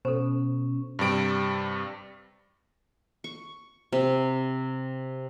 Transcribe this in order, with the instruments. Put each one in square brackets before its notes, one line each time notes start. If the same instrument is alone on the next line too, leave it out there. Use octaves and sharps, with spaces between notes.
[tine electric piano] B2 [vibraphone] C#4 [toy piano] A4 C5
[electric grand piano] G2 C3 G3 D7
[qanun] C#6
C3